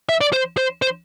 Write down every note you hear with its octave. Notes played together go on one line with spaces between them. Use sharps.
E5
D5
C5
C5
C5